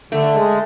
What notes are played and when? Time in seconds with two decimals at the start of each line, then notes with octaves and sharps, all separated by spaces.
0.12 D3 A3
0.34 G#3